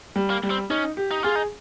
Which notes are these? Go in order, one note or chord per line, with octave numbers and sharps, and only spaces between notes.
G3
A#3
G3
C4
C#4 D#4
G4
D#4
F4 G#4
D#4